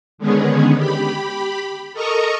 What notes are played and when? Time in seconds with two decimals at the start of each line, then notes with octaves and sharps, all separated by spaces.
0.18 D3 D#3 G#3 B3 C#4 G#4
0.76 G4 B5
1.93 A4 A#4 D#5 A#5 C#6 D#6